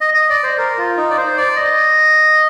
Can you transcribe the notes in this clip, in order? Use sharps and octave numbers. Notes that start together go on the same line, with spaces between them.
D#5
D#5
D5
C5
A#4
F4
D#4
D5
C5
D5
D#5